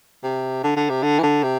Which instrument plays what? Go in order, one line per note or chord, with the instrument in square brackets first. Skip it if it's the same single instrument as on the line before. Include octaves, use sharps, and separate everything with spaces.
[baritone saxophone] C3
D3
D3
C3
D3
E3
D3
C3